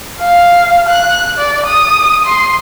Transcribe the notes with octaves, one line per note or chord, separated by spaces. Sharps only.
F5
F#6
D5
D#6
C6